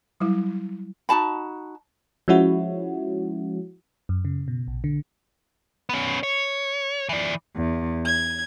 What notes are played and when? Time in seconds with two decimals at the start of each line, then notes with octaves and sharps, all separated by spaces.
0.20 F#3 G3 E4
1.09 D#4 F#4 A5 B5
2.28 F3 G#3 C#4 E4 F#4
4.09 F#2
4.25 C#3
4.48 B2
4.68 A#1
4.84 D3
5.89 B3 C#4
6.23 C#5
7.09 E3 D5
7.56 E2
8.05 G#6